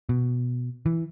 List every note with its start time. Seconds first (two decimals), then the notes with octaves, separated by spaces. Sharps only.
0.09 B2
0.86 E3